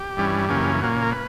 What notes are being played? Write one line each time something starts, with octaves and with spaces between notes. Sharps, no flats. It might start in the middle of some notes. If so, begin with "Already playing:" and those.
Already playing: G4
G2 E3 G3 C#4
F#2 C#3 E3 A#3 C#4 G4
A#2 A#3 C#4 F#4
A#4
B4